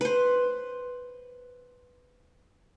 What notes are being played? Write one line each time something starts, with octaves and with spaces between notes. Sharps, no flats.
B4 C5